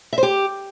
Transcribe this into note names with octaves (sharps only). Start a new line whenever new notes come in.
E5
C5
G4